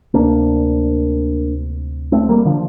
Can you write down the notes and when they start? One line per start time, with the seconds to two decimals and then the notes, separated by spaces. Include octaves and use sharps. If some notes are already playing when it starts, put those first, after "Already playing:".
0.14 D2 C3 A#3 D4
2.12 A3 C4
2.29 G3 A#3
2.45 D3 F3